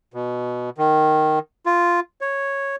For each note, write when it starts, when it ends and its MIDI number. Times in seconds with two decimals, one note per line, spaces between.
0.14 0.70 47
0.78 1.39 51
1.66 2.00 65
2.21 2.76 73